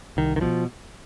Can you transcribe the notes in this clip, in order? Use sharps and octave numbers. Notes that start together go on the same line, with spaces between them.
C2 D#3
D#3
B2 F3